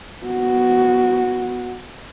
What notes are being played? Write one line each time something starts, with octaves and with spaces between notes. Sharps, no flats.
B3 F#4